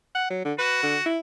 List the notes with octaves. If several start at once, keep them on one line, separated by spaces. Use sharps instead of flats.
F#5
F#3
D3
F#4 B4
D3
E4